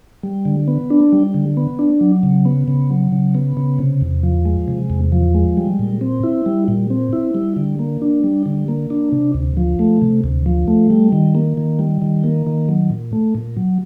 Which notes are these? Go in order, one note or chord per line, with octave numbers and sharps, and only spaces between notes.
G3
D3
B3
D4
G3
D3
B3
D4
F#3
C#3
B3
C#3
F#3
C#3
B3
C#3
C3
E2
F3
G#3
C3
E2
F3
G#3
G3
A#2
C4
E4
G3
A#2
C4
E4
G3
D3
A#3
D4
G3
D3
A#3
D4
C3
D2
F3
A3
C3
D2
F3
A3
G3
D#3
A#3
D#3
G3
D#3
A#3
D#3
F#3
A#2
A3
A#2
F#3